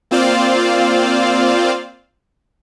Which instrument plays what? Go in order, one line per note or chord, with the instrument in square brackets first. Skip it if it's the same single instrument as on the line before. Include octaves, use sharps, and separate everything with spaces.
[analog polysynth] A#3 C4 F4 C5 D5 F5